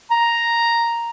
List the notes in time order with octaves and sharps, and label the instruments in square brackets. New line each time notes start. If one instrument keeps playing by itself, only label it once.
[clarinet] A#5